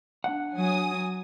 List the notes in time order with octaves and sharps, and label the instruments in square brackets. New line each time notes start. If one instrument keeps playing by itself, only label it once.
[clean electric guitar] D4 F#5
[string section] F#3 G#5 D#6